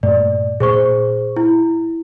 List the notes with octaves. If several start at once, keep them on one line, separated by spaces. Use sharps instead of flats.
G2 A#2 A3 D5
A#2 G#4 C5 C#6
E4